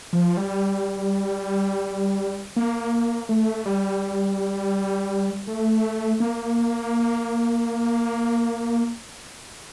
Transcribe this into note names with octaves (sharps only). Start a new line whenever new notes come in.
F3
G3
A#3
A3
G3
A3
A#3